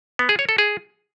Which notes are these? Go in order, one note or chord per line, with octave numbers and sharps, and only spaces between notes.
B3
G#4
C#5
A4
G#4